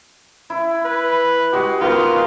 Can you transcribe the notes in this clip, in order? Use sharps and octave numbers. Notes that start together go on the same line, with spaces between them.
E4
B4
G#3 F#4 G4
D#3 B3 F4